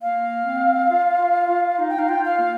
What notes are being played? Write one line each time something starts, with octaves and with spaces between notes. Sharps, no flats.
A#3 F5
C4
F4
F4
F4
D#4
G5
D#4 F5
F4 G5
F5
A#3